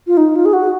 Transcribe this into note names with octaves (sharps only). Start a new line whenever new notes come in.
F4
D#4
F4
G#4
F#4